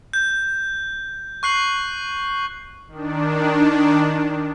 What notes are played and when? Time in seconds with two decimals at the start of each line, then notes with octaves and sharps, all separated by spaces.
0.13 G6
1.43 C#6 F#6 C7 F#7
2.88 D#3 D4